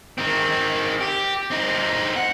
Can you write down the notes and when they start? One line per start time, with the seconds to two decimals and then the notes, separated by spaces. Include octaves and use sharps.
0.18 D#3 C4
1.01 G4
1.51 C4 D#4
2.16 F#5